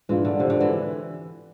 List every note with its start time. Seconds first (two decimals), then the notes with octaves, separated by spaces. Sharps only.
0.09 G#2 E3 G#3 D4 F4
0.25 D3
0.40 C3
0.50 D3
0.60 E3